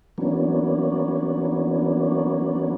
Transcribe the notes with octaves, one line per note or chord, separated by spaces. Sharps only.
E3 F#3 A#3 B3 C#4 D4